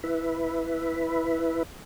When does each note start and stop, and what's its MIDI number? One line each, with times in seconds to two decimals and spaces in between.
0.04 1.63 64
0.04 1.63 71